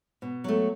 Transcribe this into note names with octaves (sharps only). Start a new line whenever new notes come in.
B2
F#3 A3